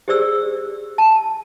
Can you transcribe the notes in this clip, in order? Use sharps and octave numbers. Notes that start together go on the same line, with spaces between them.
G4 G#4 C5 D5 E6
A5